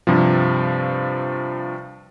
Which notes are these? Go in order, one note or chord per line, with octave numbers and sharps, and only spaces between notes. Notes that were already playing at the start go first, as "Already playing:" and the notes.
G2 C3 F3